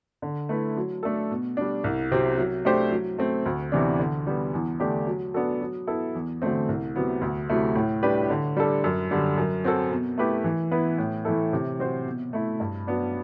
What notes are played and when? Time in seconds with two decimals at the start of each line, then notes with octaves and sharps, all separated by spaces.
0.22 D3
0.49 A3 E4 B4
0.77 F#3
1.03 A3 D4 A4
1.31 B2
1.57 G3 D4
1.84 C2
2.11 C3 F#3 C4
2.38 F#3
2.65 A3 D4 G4 C5
2.91 F#3
3.18 A3 C4
3.46 D2
3.72 C3 E3 B3 D4
3.99 D3
4.27 G3 B3
4.54 E2
4.80 D3 A3 D4 G4
5.07 F#3
5.34 B3 D4 F#4 A4
5.61 F#3
5.87 B3 E4 A4
6.15 E2
6.42 D3 F#3 A3 C4
6.69 C2
6.96 C3 F#3 B3
7.21 D2
7.49 C3 F#3 A3 E4
7.75 A2
8.03 G3 D4 G4 B4
8.30 D3
8.57 G3 D4 A4
8.84 F#2
9.11 D3 G3
9.38 F#2
9.64 F#3 C4 F#4 A4
9.91 B2
10.18 A3 E4 G4 B4
10.44 E3
10.71 B3 E4 B4
10.98 A2
11.25 E3 A3 E4 A4
11.53 C3
11.79 F#3 C4 F#4 C5
12.06 B2
12.33 A3 E4
12.60 G2
12.87 F#3 B3 D4